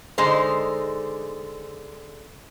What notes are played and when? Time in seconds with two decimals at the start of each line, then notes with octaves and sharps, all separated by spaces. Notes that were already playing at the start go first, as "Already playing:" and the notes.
0.18 D3 G#3 D#4 C5